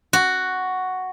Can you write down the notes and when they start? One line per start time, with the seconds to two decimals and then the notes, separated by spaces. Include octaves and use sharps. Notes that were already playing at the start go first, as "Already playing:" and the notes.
0.13 F#4